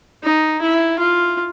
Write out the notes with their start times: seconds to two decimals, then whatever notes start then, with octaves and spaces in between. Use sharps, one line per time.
0.23 D#4
0.62 E4
0.99 F4